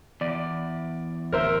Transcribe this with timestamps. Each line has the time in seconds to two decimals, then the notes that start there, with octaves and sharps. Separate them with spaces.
0.21 E2 D5
1.32 D1 A#4 C5 E5